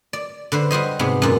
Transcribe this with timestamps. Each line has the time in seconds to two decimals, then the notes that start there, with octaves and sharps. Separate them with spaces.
0.13 D5
0.52 D3 B4 C5
0.71 G3 F#4 C5 D#5
0.99 G#2 C3 B3
1.22 F#2 A#2